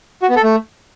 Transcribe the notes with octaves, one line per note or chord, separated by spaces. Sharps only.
F#4
B3
A4
A3